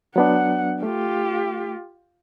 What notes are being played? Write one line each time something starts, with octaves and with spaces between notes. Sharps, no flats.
F#3 B3 D4 F#5
A3 F4 G4